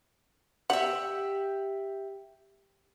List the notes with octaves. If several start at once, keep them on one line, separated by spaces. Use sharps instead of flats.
G4 E5 F#5